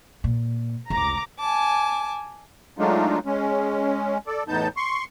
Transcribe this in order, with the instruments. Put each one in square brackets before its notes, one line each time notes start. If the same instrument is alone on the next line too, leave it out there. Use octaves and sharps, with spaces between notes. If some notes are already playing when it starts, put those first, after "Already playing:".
[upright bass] A#2
[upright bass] F1 C#2 [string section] A#5 D6
[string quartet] G#5 A5 D6
[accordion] F#3 G#3 A3 D4 D#4 F4
G#3 C#4
A4 D5
E2 A2 B3 D#4 A5 G6
C6 C#6